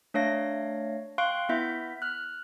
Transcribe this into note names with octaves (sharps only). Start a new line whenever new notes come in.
A3 D4 C#5 F5 A#6
F5 G5 C6 C#6 F#6 D7
B3 E4 E5 G6 B6
F6 F#6